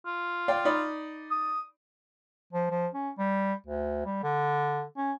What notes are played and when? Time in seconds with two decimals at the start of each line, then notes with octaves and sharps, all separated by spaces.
0.06 F4
0.48 D5 F5 G5
0.65 D#4 D5 B5
1.31 D#6
2.53 F3
2.70 F3
2.94 C#4
3.18 G3
3.67 D2
4.06 G3
4.24 D3
4.97 C#4